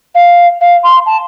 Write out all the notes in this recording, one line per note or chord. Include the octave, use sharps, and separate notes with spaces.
F5
F5
C6
A5